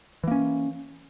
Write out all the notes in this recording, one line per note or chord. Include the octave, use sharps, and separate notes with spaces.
E3 A#3 C#4